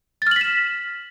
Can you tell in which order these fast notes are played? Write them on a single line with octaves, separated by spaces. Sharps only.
A6 F6 F#7 B6 E7